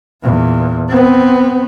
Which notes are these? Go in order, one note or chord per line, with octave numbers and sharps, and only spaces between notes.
E2 A#2
B3 C4